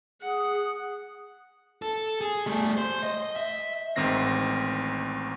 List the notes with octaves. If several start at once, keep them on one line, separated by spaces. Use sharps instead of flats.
G#4 F#5
A4
G#4
G3 A3
C5
D#5
E5
A1 G#2 D#3 C4 A#6 C7